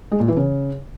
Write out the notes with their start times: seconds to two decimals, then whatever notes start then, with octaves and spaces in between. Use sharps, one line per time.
0.12 G#3
0.20 A#2
0.28 E3
0.37 C#3